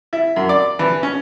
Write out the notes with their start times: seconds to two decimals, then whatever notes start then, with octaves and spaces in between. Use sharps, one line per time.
0.13 E4
0.36 F#2
0.49 D5
0.79 E3
1.03 C#4